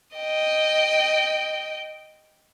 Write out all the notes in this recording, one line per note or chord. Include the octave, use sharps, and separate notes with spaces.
D#5 G5